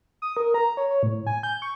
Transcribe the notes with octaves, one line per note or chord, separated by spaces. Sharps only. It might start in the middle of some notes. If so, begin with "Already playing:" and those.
D#6
A#4
A#5
C#5
C#5
A2
G#5
G6
C#6